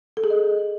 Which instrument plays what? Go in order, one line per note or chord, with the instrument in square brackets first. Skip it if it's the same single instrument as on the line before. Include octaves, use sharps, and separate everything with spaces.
[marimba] A4
G#4
D#5